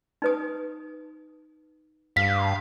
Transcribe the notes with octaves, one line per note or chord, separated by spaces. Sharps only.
D#4 B4 D#6
G2 F5 B6